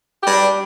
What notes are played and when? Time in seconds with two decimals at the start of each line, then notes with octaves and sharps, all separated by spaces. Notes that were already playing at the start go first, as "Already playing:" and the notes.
0.22 G4
0.27 G3
0.31 D4